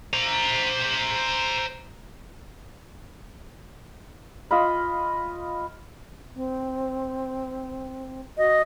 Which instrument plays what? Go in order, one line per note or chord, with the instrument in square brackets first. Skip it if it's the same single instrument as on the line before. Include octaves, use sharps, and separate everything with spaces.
[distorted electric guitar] C5 A#5
[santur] F4 D#5 F5 B5
[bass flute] C4
[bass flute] F#4 [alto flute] D#5